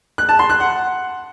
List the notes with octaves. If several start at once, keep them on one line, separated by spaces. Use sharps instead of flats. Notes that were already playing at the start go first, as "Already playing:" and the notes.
F#6
A5
C6
F#6
F#5